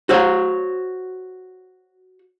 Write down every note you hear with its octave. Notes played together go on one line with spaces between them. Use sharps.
F#4 C5 C#5